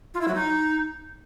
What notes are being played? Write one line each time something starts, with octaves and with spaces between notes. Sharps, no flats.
F4
E4
F#3
D#4